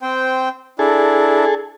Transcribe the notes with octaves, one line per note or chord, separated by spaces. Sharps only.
C4 C5 G5
D4 E4 G#4 A4